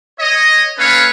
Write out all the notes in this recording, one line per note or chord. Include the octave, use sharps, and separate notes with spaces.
C#5 D#5
A#3 C#4 A4 B4 C#5 F5